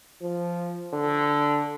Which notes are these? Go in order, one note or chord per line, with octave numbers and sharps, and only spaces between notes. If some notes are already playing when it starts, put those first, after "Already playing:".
F3
D3